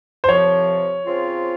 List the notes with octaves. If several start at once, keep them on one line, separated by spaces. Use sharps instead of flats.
C5
C2 C3 F3 C#5
C#3 F3 C4 F4